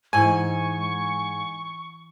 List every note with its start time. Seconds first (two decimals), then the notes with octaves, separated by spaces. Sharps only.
0.13 G#2 E3 E4 C5 G#5 C#6